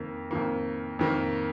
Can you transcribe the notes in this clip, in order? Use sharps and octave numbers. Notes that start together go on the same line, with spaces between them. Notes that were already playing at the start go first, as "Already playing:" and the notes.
Already playing: F2 D#3 A#3
F2 D#3 A#3
F2 D#3 A#3